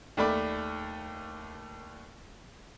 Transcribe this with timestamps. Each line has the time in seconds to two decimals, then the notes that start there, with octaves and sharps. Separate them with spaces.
0.17 D#2 A3 D5 B5 D6